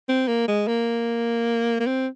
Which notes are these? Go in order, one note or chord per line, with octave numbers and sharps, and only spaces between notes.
C4
A#3
G#3
A#3
A#3
C4